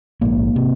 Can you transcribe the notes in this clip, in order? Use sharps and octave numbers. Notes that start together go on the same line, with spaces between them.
A#1 G#2 A#3
C3